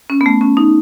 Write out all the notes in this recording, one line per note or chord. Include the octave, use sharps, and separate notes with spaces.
C#4
B3
A3
C#4
D#4